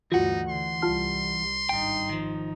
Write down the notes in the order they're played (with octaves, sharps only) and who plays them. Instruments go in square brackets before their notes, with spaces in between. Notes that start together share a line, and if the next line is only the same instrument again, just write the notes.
[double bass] D2 G2 [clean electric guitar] E3 F#5 [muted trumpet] D#4 [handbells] F4 F#4
[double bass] D3 [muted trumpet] C6
[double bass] C2 G3 [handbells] F4 A5 F6
[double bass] G#1 D#4 [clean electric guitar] G2 G5
[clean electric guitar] D#3 F3